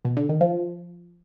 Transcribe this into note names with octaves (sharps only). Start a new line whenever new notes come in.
B2
D3
D#3
F3